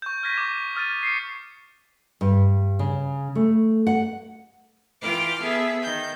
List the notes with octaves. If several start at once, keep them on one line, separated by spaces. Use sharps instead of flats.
C#6 G6
F6 G6 G#6 A#6 B6 D#7
C#6 D6
D#6 F6 A6 D#7
C7 C#7
G2
C#3
A3
F#5
E3 F4 G5 D6 F6
B3 G#4 A4 E5
D#3 G6